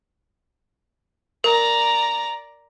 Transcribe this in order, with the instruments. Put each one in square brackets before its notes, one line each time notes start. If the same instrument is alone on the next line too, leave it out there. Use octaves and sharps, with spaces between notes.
[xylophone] A#4 [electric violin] D5 A#5